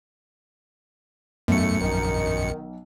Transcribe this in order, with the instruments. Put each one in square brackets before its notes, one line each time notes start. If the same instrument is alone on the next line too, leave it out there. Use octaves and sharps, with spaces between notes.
[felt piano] B1 [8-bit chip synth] F#2 C#7 [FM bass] A3
[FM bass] A#1 [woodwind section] D#3